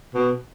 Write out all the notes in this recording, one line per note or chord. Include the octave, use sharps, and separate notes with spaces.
B2